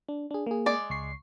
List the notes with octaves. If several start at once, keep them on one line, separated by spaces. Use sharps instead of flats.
D4
D4 G#4
A#3 G#4
G#3 D5
C#2 C#6 C7